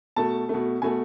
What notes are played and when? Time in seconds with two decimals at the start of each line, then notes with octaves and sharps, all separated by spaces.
0.16 B2 A3 A5
0.49 B2 A3
0.82 B2 A3 G#5